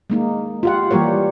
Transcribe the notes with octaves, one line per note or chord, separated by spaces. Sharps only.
G#3 A#3 D#4
F4 G4 F#5
E3 G3 A#3 G4 A#4 C#5